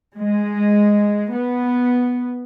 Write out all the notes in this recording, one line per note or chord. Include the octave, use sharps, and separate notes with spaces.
G#3
B3